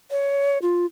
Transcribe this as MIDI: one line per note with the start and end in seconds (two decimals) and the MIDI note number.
0.11 0.58 73
0.62 0.86 65